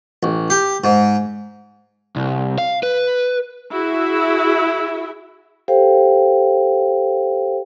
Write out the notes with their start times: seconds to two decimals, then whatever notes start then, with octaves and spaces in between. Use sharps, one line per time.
0.23 A1
0.50 G4
0.84 G#2
2.16 C2
2.58 F5
2.83 B4
3.73 E4 F#4 G#4 E5
5.68 G4 A4 C5 F5 G5